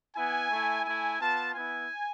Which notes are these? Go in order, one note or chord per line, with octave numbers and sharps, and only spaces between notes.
B3 E4 G#5
A3 E4
A3 E4 G#5
B3 F4 A5
B3 E4 G#5